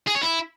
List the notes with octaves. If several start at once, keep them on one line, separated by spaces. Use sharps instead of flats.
G#4
C#5
E4